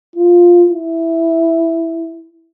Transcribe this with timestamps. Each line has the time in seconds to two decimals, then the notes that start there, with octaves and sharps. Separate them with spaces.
0.16 F4
0.70 E4